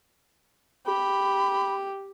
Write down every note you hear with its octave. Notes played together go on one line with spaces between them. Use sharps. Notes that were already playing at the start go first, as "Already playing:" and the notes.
G4 B5